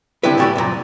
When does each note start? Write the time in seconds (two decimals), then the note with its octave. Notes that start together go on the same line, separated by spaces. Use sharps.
0.23 D3 G3 C4 D4 E4 B4
0.37 A2 E3 G3 A3 F#4 G4
0.56 C2 F#2 A#2 A#5